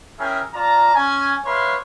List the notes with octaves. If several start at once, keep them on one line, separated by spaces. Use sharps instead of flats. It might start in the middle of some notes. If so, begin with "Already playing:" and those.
C#4 E4 G#4 A#4 E5 G5
F4 D5 A5 A#5
C#4 G#5
D4 B4 C#5 E5 F5 C6